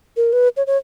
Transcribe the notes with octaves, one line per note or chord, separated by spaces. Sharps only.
A#4
B4
C#5
C#5